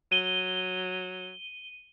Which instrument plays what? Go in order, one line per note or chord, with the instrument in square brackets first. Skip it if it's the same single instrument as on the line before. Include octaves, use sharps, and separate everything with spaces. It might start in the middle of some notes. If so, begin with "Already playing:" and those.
[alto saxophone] F#3 [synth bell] D#7 G7